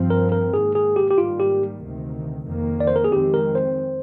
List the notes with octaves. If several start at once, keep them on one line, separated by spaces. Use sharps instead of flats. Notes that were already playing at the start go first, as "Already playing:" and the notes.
Already playing: G2 F3 C4
A#4
A#4
G#2 D#3 A#3 G#4
G#4
G4
G4
G#2 D#3 G3 A#3 F4
G4
D2 C3 D#3
F2 D#3 A#3
D5
C5
A#4
G#4
F2 D#3 G#3 C4 G4
A#4
C5